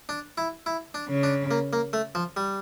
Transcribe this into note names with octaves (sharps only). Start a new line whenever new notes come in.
D4
E4
E4
D4
C#3
D4
A#3
A#3
A3
F3
G3